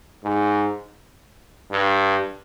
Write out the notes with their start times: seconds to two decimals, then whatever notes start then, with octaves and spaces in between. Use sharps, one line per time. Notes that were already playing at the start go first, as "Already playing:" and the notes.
0.23 G#2
1.72 G2